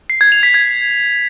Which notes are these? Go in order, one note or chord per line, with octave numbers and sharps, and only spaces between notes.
C7
G#6
F7
B6
G#6